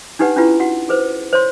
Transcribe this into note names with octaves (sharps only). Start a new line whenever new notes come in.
D4 D#4 G4 B4 F#5
C#4 D4 E4 F4 G4 B4
F#4 F#5
G#4 B4 C5
C5 C#5 C6